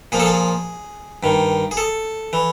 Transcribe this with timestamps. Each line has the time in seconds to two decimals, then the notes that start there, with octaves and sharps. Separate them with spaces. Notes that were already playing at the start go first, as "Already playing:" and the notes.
0.12 A#2 F3 G#4
0.20 A4
0.26 G#4
1.23 G2 D#3
1.71 G#4
1.77 A4
2.33 E3